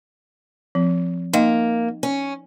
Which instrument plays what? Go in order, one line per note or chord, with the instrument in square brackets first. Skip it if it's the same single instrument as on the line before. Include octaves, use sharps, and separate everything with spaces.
[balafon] F3 C4
[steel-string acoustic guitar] A#3 [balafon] D#4 D#5 G5
[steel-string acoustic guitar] C#4